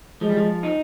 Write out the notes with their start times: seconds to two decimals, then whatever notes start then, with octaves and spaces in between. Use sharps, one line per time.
0.21 F3 G#3
0.29 G3
0.37 F3
0.63 D#4